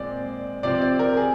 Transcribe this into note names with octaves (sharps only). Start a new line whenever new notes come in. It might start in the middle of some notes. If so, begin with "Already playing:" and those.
Already playing: A#2 G#3 C4 D5
C3 F3 C4 D5
D5
A#4
G#4